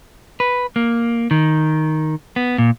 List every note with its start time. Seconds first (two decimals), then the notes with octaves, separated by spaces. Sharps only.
0.40 B4
0.76 A#3
1.31 D#3
2.36 B3
2.58 A#2